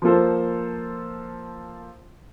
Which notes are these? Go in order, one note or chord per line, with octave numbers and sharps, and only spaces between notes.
F3 A#3 F4 A4 C5